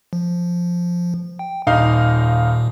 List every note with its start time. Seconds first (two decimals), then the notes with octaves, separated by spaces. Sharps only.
0.13 F3
1.39 G5
1.67 D#1 A#2 D#4 F5